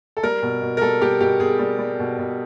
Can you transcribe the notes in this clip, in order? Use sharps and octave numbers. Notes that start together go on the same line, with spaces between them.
A4
G3 A#4
B2
B2
A#4
G3 A4
G3 G4
B2 G4
B2 G#4
G3
G3
B2
B2